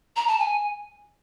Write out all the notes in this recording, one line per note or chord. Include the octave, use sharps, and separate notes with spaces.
A#5
A5
G#5